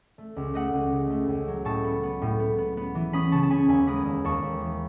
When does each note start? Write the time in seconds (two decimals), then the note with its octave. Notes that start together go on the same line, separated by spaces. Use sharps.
0.18 A3
0.36 C#2
0.54 A3 D#5 F#5
0.73 C#2
0.92 C#3
1.10 A3
1.28 C#2
1.48 F#3
1.65 A2 A5 C#6
1.84 B3
2.03 B3
2.22 A2
2.40 B3
2.58 B3
2.77 B3
2.95 E3
3.13 C#4 B5 D#6
3.32 C#3 A5 C#6
3.43 A5
3.50 C#4 G#5 B5
3.68 D#2 G#5 B5
3.87 G#3 B5 D#6
4.05 D#2
4.24 D#2 A5 C#6
4.42 D#2
4.61 E3